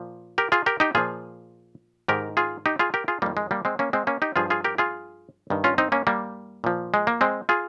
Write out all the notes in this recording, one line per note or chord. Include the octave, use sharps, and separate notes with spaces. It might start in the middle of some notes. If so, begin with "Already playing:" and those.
Already playing: A#2 F3
G4 A#4
F4 G#4
G4 A#4
D#4 G4
A#2 F3 F4 G#4
G#2 D#3 G4 A#4
F4 G#4
D#4 G4
F4 G#4
G4 A#4
F4 G#4
F2 D#3 G3 A#3
G#3
G3 A#3
G#3 C4
A#3 C#4
G#3 C4
A#3 C#4
D#4 G4
G2 F3 F4 G#4
F4 G#4
G4 A#4
F4 G#4
G2 D#3
C#4 F4
C4 D#4
A#3 C#4
G3 A#3
A#2 F3
G#3
A#3
G#3 C4
F4 G#4